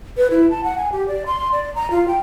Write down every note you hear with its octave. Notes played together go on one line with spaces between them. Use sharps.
B4
E4
A5
F#5
G#5
G4
D5
C6
D5
A#5
F4
G5